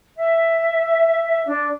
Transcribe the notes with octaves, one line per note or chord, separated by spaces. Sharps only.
E5
D4